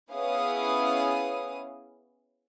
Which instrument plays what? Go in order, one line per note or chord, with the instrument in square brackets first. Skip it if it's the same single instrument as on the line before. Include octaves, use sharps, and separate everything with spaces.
[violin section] B3 C#4 E4 G#4 F5 D#6